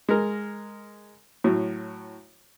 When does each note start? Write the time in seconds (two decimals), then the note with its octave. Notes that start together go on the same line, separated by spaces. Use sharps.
0.09 G#3 A#4
1.44 A2 F#3